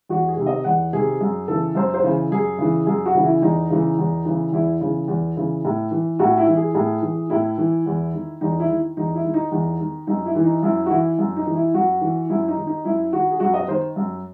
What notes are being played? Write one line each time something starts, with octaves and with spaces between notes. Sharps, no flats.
E2 F#4
G#4
C3 D#3
D#5
E2 F#5
C3 D#3 G#4
F#2 G#4
C#3 E3 A4
F#2 C5
C5
C#3 E3
F#2 G#4
C#3 E3
F#2 G#4
F#4
C#3 E3
E4
E2 D#4
C#3 E3
E2
C#3 E3
E2 E4
C#3 E3
E2
C#3 E3
A2
E3
A2 F#4
E4
E3
G#4
A2 G#4
E3
A2 E4
E3
E2
D#3
E2 D#4
E4
D#3
E2 D#4
E4
D#3
D#4
E2 D#4
D#3
F#2 D#4
E4
E3
D#4
F#2 E4
F#4
E3 E4
F#2
D#4
E3
E4
F#2 F#4
E3
F#2 E4
D#4
D#3
D#4
F#2 E4
D#3 F#4
G#4
F#2 F#4
D#5
D#3 C5
F#2